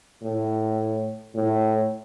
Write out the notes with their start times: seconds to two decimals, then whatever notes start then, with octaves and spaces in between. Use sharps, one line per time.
0.22 A2
1.35 A2